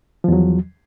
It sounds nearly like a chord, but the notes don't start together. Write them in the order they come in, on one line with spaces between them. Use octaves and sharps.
F3 E2 F#3